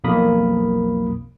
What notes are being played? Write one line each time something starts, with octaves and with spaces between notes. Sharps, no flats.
B1 F2 A#3 A#4 B5 D#6